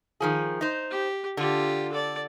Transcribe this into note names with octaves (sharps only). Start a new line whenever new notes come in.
D#3 F3 G#4
D#4 C5
G4
D3 F4 G4
A4 D5